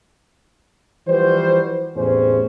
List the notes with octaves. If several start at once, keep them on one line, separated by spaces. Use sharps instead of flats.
E3 F3 G3 F#4 B4 C5
E2 A2 C3 C#4 G#4 C5